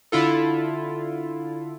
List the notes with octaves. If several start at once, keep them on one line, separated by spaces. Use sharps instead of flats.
D3 E4 F4 A4